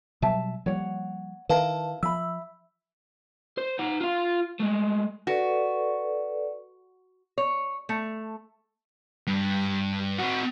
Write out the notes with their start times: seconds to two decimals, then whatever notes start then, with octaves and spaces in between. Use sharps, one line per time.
0.22 B2 F#3 G3 E5 A5
0.66 F3 G3 A#3 C#5 F#5
1.49 D#3 E4 A#4 B4 F5 A5
2.03 F3 E5 B5 E6
3.58 C5
3.79 D#4 F#5
4.01 F4 F5
4.60 G#3 A3
5.27 F#4 A4 B4 D5
7.38 C#5
7.89 A3
9.27 G2
10.18 C4 F#4